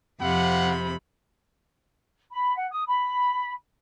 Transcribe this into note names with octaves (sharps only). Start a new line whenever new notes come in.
F2 C3 F5 F#5 B5
B5
F#5
D#6
B5